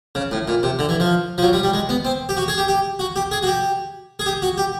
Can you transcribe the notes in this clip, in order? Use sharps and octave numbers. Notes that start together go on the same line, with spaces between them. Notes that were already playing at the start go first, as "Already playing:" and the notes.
C#3
A2
A#2
C3
D3
E3
F3
F3
F#3
G3
G3
G#3
B3
C4
G4
F#4
G#4
G4
G4
F#4
G4
G#4
F#4
G4
G#4
G4
F#4
G4